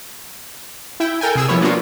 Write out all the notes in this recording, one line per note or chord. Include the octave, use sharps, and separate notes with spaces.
E4 G5
A4 A#4 G5 G#5
C3 G#4 E6
F3 G3 B3 E4 C#5
A#3 B3 D4 F4 F#4